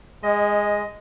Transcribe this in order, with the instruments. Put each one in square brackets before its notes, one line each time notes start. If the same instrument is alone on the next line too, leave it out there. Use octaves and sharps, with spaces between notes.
[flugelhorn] G#3 [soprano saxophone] D#5